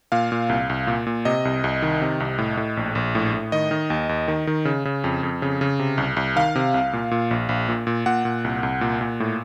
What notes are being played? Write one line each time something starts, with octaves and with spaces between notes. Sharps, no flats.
A#2 F5
A#2
C2
C2
A#2
A#2
C3 D#5
C2
C2
D#3
C3
C2
A2
A2
A#1
A#1
A2
A2
D#3 D#5
D#3
D#2
D#2
D#3
D#3
C#3
C#3
F2
F2
C#3
C#3
C3
C2
C2
D#3 F5
C3
C2
A#2
A#2
A#1
A#1
A#2
A#2
A#2 F#5
A#2
C2
C2
A#2
A#2
A2